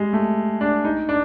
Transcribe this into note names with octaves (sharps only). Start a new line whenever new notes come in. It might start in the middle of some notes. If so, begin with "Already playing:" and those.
Already playing: G3 G#3
A3
D4
D#4
D4